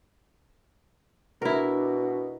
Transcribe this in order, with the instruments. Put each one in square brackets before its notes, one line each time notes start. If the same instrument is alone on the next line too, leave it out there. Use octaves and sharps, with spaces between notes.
[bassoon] B2 [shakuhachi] D4 [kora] E4 A#4